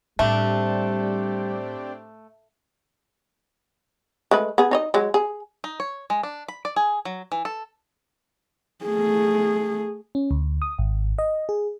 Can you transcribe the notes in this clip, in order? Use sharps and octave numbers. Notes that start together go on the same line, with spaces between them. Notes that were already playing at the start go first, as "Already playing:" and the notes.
A2 G3 A3 C4 D4 G4
G#3 A3 B4
B3 G#4
D#4 C#5 D#5
F#3 G#3
G#4
D#4
C#5
G#3
D4
B5
D5
G#4
F#3
E3
A4
A3 G#4
C#4
D2
D#6
G#1
D#5
G#4